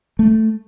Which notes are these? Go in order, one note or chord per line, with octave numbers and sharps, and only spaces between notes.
A3